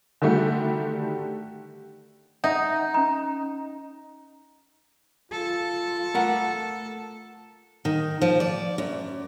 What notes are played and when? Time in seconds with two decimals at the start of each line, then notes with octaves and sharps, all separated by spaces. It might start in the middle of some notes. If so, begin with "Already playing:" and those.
0.22 D3 D#3 G3 A3 F#4 G4
2.44 D#4 E5 F#5
2.94 C#4 A#5
5.32 F4 A4
6.14 A3 A#4 F#5
7.85 D#3
8.22 F3
8.40 D5
8.78 F#2